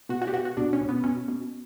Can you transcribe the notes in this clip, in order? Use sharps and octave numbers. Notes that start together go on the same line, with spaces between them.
B2 F#4
F#4
G4
B2 F#4
F#4
B2 D4
C#4
B2
B3
B2 C#4
B2